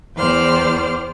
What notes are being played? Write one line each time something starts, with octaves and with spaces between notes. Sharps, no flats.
E2 C5 D5 G5 F6